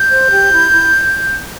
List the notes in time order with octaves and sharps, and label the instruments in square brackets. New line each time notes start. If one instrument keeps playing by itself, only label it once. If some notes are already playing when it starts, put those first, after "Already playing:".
Already playing: [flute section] G6
C5
G4
E4
E4